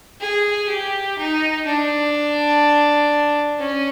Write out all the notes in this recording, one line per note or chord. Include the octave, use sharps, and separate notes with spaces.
G#4
G4
D#4
D4
C#4